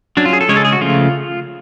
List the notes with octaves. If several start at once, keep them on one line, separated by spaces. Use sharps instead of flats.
F#3 C#4 D4
F4
G#4
A4
C#3 G#3 C#4 C#5
A4
G#4
F#4
C#3 F3 A3 F4